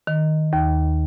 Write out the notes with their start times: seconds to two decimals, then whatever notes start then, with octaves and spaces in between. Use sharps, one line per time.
0.07 D#3
0.53 D#2